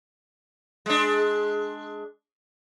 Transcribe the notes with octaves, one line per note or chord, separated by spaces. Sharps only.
G#3 D4